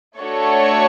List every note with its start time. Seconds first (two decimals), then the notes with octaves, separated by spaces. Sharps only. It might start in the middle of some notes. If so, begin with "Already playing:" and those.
0.19 A3 D4 F#4 A4 C#5